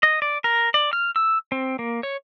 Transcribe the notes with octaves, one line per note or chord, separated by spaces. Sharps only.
D#5
D5
A#4
D5
F6
E6
C4
A#3
C#5